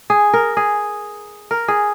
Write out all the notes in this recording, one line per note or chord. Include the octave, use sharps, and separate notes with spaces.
G#4
A#4
G#4
A#4
G#4